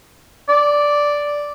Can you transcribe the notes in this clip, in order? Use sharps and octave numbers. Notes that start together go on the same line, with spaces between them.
D5